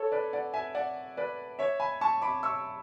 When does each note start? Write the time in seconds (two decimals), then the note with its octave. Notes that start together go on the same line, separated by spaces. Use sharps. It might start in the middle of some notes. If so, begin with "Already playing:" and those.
Already playing: A4 C#5
0.12 B4 D5
0.33 D5 F#5
0.54 E5 G#5
0.75 D5 F#5
1.17 B4 D5
1.59 C#5 E5
1.80 G#5 B5
2.01 A5 C#6
2.22 B5 D6
2.43 C#6 E6